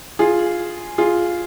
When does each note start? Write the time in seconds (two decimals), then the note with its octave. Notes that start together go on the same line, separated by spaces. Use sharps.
0.19 F4 G#4
0.98 F4 G#4